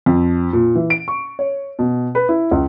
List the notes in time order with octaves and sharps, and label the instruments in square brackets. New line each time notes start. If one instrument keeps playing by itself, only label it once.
[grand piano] F2
A#2
E3
D7
C#6
C#5
B2
B4
E4
C#2